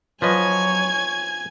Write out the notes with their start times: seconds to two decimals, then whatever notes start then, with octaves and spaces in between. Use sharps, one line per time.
0.22 F3 F#3 B4 C#5 D#5 G#5 G#6